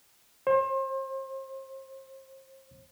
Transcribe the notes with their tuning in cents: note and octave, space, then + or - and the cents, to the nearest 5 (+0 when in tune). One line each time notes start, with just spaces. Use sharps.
C5 +35